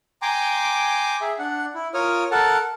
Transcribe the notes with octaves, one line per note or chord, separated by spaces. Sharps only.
G5 G#5 A#5 C6 D6
G#4 E5
D4 F#5
E4
F4 A#4 C#5 D#6 F6
A4 A#4 F#5 A5